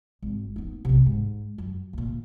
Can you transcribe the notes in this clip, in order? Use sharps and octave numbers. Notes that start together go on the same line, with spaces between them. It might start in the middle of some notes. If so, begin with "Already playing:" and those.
G#1
B3 D#4
B1 C3
G#2
F#2
D2 A#2